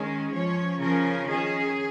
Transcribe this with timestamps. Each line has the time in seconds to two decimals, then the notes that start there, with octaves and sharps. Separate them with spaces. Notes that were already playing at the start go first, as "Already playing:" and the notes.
Already playing: D#3 G#3 C#4 G#4
0.32 F3 C#4 C#5
0.80 C#3 F3 C#4 A#4
1.27 D#3 C#4 G#4